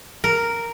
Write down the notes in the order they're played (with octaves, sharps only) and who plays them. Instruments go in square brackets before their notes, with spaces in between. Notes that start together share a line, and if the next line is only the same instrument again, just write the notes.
[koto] A#4